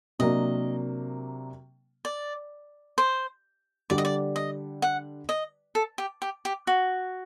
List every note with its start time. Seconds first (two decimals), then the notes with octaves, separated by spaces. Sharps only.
0.19 C3 F#3 A#3 D4 D#5
2.05 D5
2.98 C5
3.90 D3 G3 D4 D5
3.98 D#5
4.05 D5
4.36 D#5
4.82 F#5
5.29 D#5
5.75 A4
5.98 G4
6.22 G4
6.45 G4
6.67 F#4